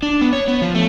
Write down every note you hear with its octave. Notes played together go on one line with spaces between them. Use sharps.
D4
B3
C#5
B3
F3
A3